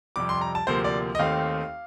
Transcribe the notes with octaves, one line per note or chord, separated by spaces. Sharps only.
F2 C3 G3 D6
C6
A#5
A5
D2 C3 F3 A#3 C5
D5
D#5
D#2 D#3 A3 C4 D#4 F5